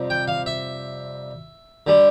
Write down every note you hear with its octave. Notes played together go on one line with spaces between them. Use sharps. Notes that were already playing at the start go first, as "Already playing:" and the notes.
Already playing: F2 C3 G3
G5
F5
E5
D3 G3